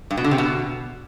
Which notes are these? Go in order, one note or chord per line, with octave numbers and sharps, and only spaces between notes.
G2
B2
D3
C3
B2